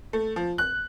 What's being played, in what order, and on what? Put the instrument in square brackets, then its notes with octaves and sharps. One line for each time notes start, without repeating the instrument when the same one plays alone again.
[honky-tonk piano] A3
F3
F#6